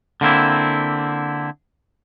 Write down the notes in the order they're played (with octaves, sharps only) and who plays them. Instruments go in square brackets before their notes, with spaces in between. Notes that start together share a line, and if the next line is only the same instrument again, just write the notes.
[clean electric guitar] D3 A#3 C4 E4